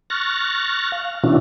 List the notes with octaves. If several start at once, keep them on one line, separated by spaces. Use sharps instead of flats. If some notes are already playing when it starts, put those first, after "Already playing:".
C#6 F6 F#6 A6 A#6
F5
B2 E3 C#4 D4 E4 F#4